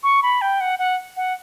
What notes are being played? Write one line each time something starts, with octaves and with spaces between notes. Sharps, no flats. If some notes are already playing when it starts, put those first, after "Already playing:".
C#6
B5
G5
F#5
F#5
F#5